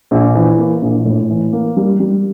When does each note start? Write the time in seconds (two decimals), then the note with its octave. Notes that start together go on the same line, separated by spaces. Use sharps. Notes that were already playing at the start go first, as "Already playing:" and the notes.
0.11 A#1
0.35 E3
0.59 A#3
0.82 A#1
1.05 A2
1.29 E3
1.53 A#3
1.77 G3
2.00 G3